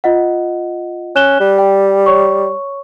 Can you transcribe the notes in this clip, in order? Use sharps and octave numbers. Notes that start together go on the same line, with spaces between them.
F4 D#5 F#5
C#4 F#6 E7 G7
G3
G5
C#5 C#6